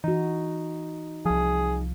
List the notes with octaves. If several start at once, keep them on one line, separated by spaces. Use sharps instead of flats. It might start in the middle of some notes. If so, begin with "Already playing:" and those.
E3 D#4 F#4
C2 F3 G#4